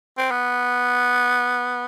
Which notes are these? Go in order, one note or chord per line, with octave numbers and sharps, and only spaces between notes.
C4
B3